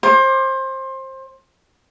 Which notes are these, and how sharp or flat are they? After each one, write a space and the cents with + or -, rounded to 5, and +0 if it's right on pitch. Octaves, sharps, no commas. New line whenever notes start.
C5 +25 D6 +0